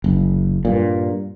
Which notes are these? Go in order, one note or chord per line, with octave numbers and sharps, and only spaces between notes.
F#1
G2 A#2